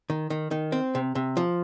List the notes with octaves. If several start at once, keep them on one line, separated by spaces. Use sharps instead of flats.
D#3
D#3
D#3
C4
C3
C3
F3